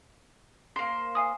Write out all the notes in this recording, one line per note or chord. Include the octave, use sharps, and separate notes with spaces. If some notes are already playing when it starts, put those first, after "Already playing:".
A#3 C5
F5 G#5 D#6